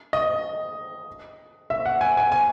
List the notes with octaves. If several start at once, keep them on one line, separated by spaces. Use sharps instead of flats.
D#5
E5
F#5
G#5
G#5
G#5